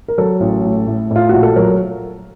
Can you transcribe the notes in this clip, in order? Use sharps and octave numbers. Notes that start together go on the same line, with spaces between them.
A#4
F#3 A4
A1
A2
A2
A2 F4
A#1 F#4
A4
F#3 A#4